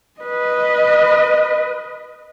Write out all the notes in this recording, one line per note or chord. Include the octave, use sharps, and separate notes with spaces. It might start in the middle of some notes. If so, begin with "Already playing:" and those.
B4 D#5